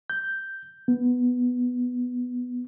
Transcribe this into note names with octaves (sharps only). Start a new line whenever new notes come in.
G6
B3